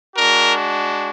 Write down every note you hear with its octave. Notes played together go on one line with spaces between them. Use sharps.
G#3 D4 F#4 A#4